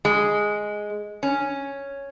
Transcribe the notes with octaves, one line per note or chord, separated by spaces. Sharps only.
G#3
C#4